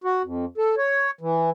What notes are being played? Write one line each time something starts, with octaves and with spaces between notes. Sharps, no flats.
F#4
F2
A4
C#5
E3